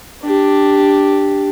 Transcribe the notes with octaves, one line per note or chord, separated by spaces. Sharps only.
D4 G4